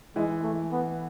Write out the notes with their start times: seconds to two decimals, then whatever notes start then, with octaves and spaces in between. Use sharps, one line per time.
0.16 E3 G#3
0.43 A3
0.72 B3